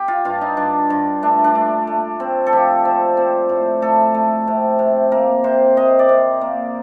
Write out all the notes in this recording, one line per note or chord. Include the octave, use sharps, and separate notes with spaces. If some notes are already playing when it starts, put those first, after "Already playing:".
Already playing: G4
F4
G2 F4
D#4
G2 D4
G2
A3 D4
D4
A3
A3
C4
A4
F3 G4
C4
C4
A2
A3 A4
A3
C3
C3
A#3 A#4
C3 C5
C3 D#5
D5
C3
A#3